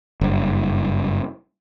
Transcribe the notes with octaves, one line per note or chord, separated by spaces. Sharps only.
F#1 G2